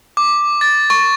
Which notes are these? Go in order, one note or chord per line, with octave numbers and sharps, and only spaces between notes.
D6
A6
C#6